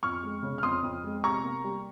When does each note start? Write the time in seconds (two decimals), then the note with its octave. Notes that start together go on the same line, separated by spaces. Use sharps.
0.03 F2 C#6 F6
0.23 G#3
0.43 C#3
0.58 F6
0.63 F2 C6 D#6
0.83 F2
1.04 G#3
1.24 C3 A#5 C#6
1.44 A#3
1.64 G3